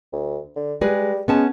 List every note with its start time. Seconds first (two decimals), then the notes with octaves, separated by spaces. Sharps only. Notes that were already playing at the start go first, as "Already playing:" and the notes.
0.13 D2
0.56 D3
0.81 G3 G#3 G#4 B4
1.28 G#3 B3 C#4 A5